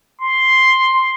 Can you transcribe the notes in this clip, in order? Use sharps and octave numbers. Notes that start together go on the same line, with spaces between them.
C6